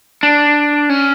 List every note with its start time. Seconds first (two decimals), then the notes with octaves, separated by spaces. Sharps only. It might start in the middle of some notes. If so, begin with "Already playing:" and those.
0.23 D4
0.90 C#4